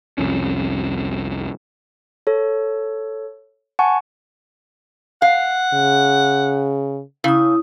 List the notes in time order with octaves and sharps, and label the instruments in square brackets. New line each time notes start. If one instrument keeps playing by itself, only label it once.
[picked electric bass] C2 F2 C#4
[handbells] A4 C#5
F#5 G#5 A5 C#6
[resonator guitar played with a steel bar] F5 [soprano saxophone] F#5
[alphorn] C#3
[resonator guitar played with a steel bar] C#3 [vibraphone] E4 D#6